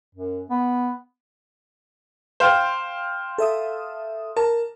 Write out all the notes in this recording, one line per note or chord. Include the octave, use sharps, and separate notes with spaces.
F#2
B3
C5 F5 G5
A4 E5 D#6
A#4 A5